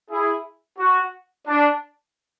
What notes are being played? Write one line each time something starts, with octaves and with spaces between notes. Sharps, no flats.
E4 G#4
F#4
D4